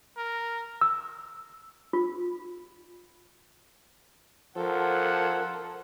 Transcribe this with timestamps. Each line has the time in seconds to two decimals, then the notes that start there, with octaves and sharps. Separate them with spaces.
0.17 A#4
0.81 E6
1.93 F4
4.56 F3 A4 A#4 F#5